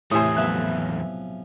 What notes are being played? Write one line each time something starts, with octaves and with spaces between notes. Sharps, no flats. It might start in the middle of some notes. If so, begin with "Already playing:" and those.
E2 A2 C3 A3 C5 G#5 D#6
B1 F3 B3 E5 F#6